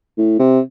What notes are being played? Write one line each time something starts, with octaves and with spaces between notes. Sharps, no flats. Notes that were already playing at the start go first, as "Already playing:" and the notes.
A2
C3